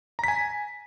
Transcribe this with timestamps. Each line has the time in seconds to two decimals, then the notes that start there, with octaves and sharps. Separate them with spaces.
0.19 A#5
0.24 B6
0.28 G#5